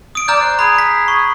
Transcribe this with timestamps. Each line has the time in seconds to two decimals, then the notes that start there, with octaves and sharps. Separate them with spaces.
0.15 D#6 D7
0.28 D5 A#5 F6 G6
0.41 C5 F#6
0.59 G#4 B5
0.78 B6
1.08 C#6